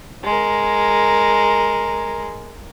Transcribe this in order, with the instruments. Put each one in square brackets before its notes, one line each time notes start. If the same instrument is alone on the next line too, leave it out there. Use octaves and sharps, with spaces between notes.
[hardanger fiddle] G#3 A#4